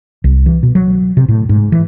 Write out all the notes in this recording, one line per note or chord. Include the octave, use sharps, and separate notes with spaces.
C2
E3
B2
F#3
C3
A2
G#2
E3